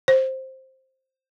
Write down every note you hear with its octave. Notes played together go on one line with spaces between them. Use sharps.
C5